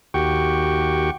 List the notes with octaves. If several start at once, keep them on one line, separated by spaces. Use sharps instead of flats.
D#2 F#4 G4 G5 C#6